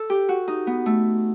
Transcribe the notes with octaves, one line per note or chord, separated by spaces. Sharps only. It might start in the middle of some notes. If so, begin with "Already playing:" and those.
Already playing: A4
G4
F#4
D#4
B3
A3